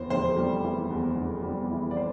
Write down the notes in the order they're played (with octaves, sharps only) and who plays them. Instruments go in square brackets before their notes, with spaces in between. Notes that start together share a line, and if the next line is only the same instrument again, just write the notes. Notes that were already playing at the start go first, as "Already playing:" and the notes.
Already playing: [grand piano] E2 E3 C5
F1 C5
G3
E3
E2
F1
G3
E3
D5
C5